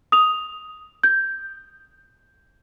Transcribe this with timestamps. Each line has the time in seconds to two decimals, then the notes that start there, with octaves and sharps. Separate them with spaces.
0.12 D#6 F7
1.03 G6